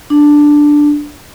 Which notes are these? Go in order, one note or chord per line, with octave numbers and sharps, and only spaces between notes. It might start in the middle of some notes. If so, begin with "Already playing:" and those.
D4